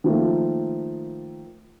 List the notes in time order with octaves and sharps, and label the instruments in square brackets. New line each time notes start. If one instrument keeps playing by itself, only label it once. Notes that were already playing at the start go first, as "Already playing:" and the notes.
[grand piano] D#3 F3 A3 A#3